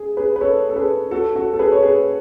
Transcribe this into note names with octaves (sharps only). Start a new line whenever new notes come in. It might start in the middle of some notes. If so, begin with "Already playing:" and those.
Already playing: G#4
G#4 B4
B4
A4 C#5
A4
G#4 B4
F#4 A4
F#4 A4
A4
G#4 B4
C#5
G#4 B4